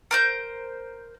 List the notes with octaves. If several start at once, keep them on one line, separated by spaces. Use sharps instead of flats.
A#4 C5 G6